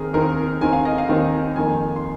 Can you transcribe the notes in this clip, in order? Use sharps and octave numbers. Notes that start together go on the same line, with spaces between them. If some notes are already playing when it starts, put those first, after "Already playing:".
Already playing: D#2 D#3 C4 G#4 A#4
D#2 D#3 C4 A#4
D#2 D#3 C4 G#5
F5
D#5
F5
D#2 D#3 C4
F2 D#3 A#3 G#5
C6